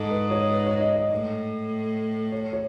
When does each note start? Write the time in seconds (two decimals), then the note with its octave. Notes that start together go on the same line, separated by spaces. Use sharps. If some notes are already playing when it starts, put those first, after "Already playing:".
Already playing: G#2 A4
0.10 B4
0.31 C#5
0.52 B4
0.66 C#5
0.81 D#5
0.96 D#5
1.11 A2
2.32 C#5
2.53 C#5